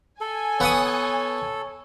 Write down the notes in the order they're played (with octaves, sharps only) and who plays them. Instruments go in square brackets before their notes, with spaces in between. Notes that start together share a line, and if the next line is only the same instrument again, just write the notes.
[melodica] A4 [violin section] G#5
[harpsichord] B3 F#5 D#6 [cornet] C#5